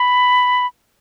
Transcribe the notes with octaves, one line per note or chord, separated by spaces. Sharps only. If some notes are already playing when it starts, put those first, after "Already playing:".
Already playing: B5